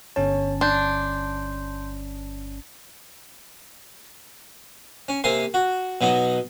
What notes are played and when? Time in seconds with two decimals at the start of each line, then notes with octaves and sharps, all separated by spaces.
0.16 G1 C#4 C#5 A5
0.61 D4 C6 G6
5.08 C#4
5.24 C3 A#3 G#5 C6
5.54 F#4
6.01 B2 F#3 D#4